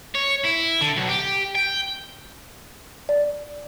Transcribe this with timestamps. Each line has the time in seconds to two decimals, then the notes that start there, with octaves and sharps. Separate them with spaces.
0.15 C#5
0.44 E4
0.81 D3
0.96 B1
1.09 G4
1.55 G5
3.09 D5